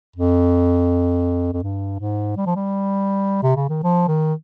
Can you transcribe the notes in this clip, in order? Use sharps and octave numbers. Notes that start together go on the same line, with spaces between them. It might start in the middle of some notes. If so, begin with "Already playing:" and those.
F2
F2
G2
G#2
G3
F3
G3
C3
C#3
D#3
F3
D#3